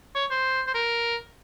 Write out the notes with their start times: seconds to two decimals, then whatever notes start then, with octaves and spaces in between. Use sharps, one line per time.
0.15 C#5
0.30 C5
0.67 C5
0.74 A#4